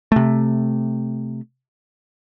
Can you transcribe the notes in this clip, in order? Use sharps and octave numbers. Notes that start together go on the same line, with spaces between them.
C3 A3